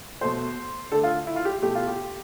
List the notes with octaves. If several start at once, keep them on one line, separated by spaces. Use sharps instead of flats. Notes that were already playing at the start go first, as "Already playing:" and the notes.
B2 A3 C5
D3 A3 A4
F4
E4
F4
G4
B2 A3 G4
F4
G4